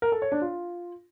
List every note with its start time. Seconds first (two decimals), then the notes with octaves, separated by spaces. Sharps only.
0.02 A#4
0.12 A4
0.22 C#5
0.32 D4
0.42 F4